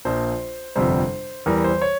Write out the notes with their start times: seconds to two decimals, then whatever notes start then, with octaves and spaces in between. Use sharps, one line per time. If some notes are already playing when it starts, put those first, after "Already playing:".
0.05 A#1 A#2 F3 C5
0.76 G1 F2 C3 G3 C5
1.46 E2 E3 G3 A#4
1.64 C5
1.81 C#5